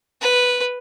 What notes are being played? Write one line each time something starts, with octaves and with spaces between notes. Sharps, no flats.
B4